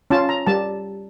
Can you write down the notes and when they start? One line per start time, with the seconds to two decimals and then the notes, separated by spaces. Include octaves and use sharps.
0.10 C#4 F4 A5
0.29 A#5
0.47 G3 A5